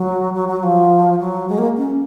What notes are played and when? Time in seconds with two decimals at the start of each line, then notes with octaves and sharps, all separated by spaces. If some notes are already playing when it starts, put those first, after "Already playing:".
Already playing: F#3
0.34 F#3
0.48 F#3
0.63 F3
1.20 F#3
1.49 G#3
1.58 A#3
1.77 C#4